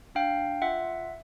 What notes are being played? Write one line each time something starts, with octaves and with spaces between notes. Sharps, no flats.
D4 F5 G5
F4 E5 F#5